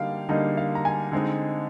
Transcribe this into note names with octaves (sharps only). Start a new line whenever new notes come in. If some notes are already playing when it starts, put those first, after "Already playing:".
Already playing: D3 G3 A#3 D#4 F5 G5
D3 G3 A#3 D#4 D#5
F5
A#5
G#5
D3 G#3 C4 D#4